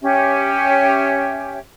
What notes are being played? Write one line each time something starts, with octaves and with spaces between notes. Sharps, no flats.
C#4 G4 E5